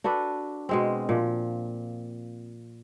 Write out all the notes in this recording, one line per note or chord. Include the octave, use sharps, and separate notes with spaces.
D4 F#4 A4 B4
B2 G#3 C4
A#2 F3